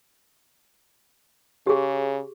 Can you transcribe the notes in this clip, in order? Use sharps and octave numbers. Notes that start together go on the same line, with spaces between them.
C#3 G4 G#4